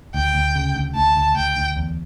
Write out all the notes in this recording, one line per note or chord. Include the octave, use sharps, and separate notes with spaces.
D2 G5
D2
C#3
D2
D2 A5
D2
D2 G5
D2
E2